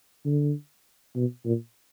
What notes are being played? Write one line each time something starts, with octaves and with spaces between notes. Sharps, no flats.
D3
B2
A#2